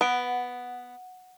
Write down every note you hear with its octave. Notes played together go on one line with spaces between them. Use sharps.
B3 F#5 D7